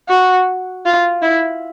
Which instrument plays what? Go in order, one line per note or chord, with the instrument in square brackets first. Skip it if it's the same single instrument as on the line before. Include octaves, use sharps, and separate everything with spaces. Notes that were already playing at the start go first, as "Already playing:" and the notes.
[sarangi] F#4
F4
E4